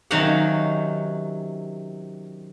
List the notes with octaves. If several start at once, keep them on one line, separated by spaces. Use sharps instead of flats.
C3 D#3 F#3 C#4 F5 F#5